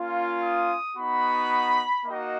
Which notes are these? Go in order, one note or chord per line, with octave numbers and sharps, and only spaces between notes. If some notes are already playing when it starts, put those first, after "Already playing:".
Already playing: A#3 C#4 F4
D#6
B3 D#4 F#4 B5
A#3 D#4 F#4 D#5